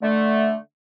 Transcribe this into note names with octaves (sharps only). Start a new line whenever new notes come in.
D3 A3